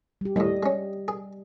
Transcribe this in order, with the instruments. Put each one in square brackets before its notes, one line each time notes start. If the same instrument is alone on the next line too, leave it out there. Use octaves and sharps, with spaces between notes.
[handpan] G3 G4
[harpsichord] D#2 A2 [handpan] G3 D#5
[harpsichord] G#3 C#4
G#4